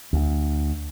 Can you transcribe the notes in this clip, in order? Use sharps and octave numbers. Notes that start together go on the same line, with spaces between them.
D2